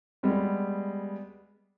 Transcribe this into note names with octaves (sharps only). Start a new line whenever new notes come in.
G3 G#3 B3